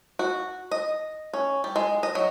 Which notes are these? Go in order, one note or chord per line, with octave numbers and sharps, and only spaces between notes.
F#4
D#5
C#4
G3
G#3
D#5
F#3